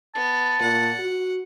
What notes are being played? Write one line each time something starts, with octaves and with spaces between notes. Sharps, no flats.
B3 A5
A#2 F#5
F#4